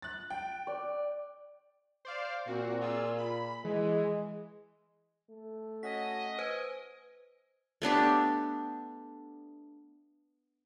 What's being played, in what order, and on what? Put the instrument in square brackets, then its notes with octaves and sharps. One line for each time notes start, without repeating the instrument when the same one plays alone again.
[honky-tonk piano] F#6 A6
G5
[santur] D5
[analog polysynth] C5 D5 F5
[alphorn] A#2 [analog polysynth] C4 F#4
[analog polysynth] F4 G#4 E6
B5
[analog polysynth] E3 [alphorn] G#3
[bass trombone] A3
[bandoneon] C#4 F#4 [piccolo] D#5 [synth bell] B6
[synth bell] B4 C5 [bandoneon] G#5
[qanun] A3 B3 D4 G4